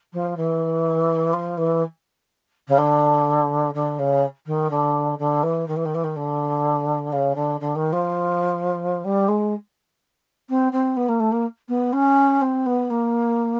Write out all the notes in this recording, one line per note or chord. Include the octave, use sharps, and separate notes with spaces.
F3
E3
F3
E3
C#3
D3
D3
C#3
D#3
D3
D3
E3
D#3
E3
D#3
E3
D#3
D3
C#3
D3
D3
D#3
F3
G3
G#3
C4
C4
B3
A#3
A3
A#3
B3
C#4
C4
B3
A#3